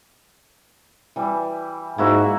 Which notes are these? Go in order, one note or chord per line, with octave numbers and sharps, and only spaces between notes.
E3 G3
G#2 A#3 E4 F#4